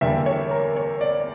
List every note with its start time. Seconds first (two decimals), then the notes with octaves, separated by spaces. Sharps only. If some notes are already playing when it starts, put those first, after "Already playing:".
0.01 E2 D3 G3 A#3 E5
0.26 C#5
0.51 A#4
0.76 C#5
1.01 D5